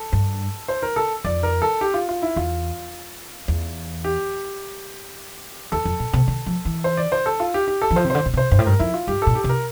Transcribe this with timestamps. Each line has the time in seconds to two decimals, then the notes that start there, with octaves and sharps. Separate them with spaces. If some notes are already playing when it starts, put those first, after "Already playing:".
Already playing: A4
0.13 G2
0.68 C5
0.82 A#4
0.96 A4
1.24 F2 D5
1.43 A#4
1.62 A4
1.81 G4
1.94 F4
2.09 F4
2.22 E4
2.36 E2 F4
3.48 E2
4.04 G4
5.72 E2 A4
5.85 F2
6.00 A#2
6.13 C3
6.28 D3
6.47 F3
6.65 E3
6.84 C5
6.97 D5
7.12 C5
7.26 A4
7.40 F4
7.54 G4
7.68 G4
7.82 A4
7.91 E3
7.96 F3 C5
8.05 C3
8.10 D3 C5
8.26 A#2
8.34 C3
8.37 C5
8.51 G2 C5
8.59 A2
8.66 G2 A#4
8.79 F2 E4
8.94 F4
9.07 G2 G4
9.22 A#2 A4
9.35 G4
9.44 C3
9.49 A#4